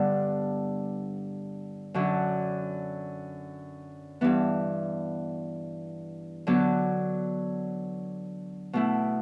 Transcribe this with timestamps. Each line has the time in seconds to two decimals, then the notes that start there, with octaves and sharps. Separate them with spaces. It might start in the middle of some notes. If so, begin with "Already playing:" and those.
Already playing: G2 D3 G3 B3 D4
1.94 F#2 D3 F#3
4.21 G2 E3 B3
6.47 D3 F#3 B3
8.73 B2 A3 E4